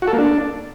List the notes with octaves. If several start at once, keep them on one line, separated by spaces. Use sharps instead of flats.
F#4
A4
A#3
D4